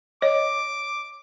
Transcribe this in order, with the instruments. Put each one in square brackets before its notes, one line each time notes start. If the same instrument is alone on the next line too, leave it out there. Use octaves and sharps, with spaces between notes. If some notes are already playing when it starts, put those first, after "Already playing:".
[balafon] C#5 [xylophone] D#5 [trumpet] D6